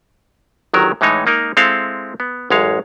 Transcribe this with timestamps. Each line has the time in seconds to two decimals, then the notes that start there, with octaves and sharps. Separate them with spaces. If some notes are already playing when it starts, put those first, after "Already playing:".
0.74 G1 D#3 F#3 A#4
1.01 A2 E3 G#3 D#4 C#5
1.26 G#3 A#3 D#4 A#4
1.57 G#3 C4 E4 A4 F5
2.20 B3
2.50 A1 F#2 G#3 C#5 F5